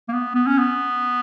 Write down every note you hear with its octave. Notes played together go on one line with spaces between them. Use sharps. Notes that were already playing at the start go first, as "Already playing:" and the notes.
A#3
B3
B3
C#4
B3